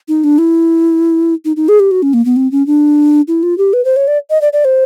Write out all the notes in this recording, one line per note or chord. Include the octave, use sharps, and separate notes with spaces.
D#4
D4
E4
D#4
D#4
G#4
G4
F#4
C#4
A#3
B3
C4
C#4
D4
E4
F4
G4
B4
C5
C#5
D5
D#5
D5
D5
C5